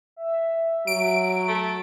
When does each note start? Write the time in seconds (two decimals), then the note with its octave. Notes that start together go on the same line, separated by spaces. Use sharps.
0.16 E5
0.87 F#3 D7
1.48 A3